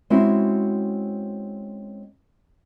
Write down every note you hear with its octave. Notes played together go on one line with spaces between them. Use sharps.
G#3 C4 C#4 E4 F#4